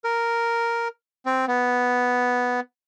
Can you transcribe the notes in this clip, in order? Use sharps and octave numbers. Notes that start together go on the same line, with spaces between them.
A#4
C4
B3